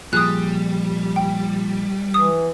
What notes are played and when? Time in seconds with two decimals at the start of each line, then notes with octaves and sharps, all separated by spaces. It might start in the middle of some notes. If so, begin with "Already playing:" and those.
0.13 A#2 F3 G3 G#4 D#6 F#6
1.16 G5
2.14 E3 D#6